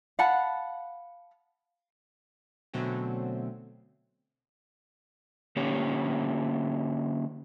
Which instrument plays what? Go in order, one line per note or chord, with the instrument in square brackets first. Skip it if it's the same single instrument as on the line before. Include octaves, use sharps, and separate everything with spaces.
[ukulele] F5 F#5 A5 B5
[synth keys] B2 D3 F#3 A3 C4 C#4
[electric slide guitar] D3 A#3 C#4 G4 C#5